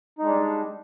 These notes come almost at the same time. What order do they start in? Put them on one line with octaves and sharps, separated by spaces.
D#4 G#3 D4 G3